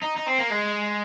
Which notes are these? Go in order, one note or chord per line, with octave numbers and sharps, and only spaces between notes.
D#4
D#4
C4
A#3
G#3